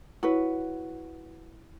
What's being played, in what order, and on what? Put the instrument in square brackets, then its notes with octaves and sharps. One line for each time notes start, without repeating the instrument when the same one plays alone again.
[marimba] E4 C#5 [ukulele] F#4 B4